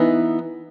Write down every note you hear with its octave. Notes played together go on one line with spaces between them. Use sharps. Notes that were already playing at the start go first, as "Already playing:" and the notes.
Already playing: E3 B3 D#4